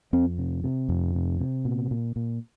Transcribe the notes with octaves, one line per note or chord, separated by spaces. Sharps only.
F2 C4
C3
C3
F2
C3
C3
A#2
A#2
A#2